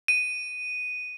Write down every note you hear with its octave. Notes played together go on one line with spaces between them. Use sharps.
D#7